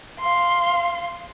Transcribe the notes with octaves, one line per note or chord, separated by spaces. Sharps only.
F5 C6